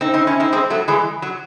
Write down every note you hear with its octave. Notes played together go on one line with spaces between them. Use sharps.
C4 D#4
C4 D#4
C#4 E4
C4 D#4
G#3 C4
F#3 A3
E3 G#3
F#3